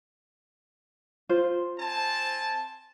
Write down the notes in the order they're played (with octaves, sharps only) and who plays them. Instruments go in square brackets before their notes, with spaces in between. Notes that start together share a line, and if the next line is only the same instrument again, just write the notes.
[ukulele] F4 C5
[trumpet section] C4 G#5 A5